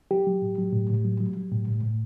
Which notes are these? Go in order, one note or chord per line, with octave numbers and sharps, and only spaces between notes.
F#3 G4
F#3
A2
F#3
A2
A2
F#3
F#3
F#3
A2
A2
A2